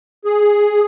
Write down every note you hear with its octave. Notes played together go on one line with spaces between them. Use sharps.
G#4